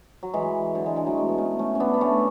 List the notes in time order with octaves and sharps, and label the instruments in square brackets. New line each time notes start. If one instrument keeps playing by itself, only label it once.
[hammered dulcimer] F#3
E3 G#3
D3 F#3
E3 G#3
E3 G#3
F#3 A3
G#3 B3
B3
A3 C#4
A3 C#4
C#4
B3 D4
B3
A3 C#4